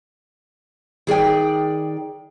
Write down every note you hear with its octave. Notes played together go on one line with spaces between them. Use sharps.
D#3 G#4 D5 G5